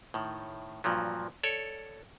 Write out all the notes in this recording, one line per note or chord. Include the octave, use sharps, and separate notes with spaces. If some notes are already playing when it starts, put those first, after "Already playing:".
A2 D#3
G2 A#2 F3 F#3
A4 C#5 D5